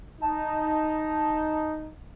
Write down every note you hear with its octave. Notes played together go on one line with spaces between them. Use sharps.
D#4 A5